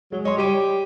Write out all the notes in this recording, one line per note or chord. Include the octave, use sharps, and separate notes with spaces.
F#3 G#3
C#5 D#5 C6
G3 G4 D#7